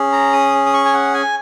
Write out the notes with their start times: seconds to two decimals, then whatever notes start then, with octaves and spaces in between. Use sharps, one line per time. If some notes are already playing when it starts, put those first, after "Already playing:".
Already playing: C#4 G#4
0.12 A#5
0.33 D#6
0.66 D#6
0.73 C#6
0.85 G#5
0.93 F#5
1.14 G#5